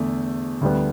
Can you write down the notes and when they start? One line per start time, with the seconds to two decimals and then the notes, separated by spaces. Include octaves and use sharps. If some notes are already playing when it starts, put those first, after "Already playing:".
Already playing: E2 D3 A3
0.61 D2 D3 G3 B3